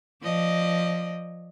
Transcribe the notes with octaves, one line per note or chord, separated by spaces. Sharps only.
F3 D5 D#5